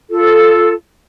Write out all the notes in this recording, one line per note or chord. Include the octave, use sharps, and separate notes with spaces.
F4 A4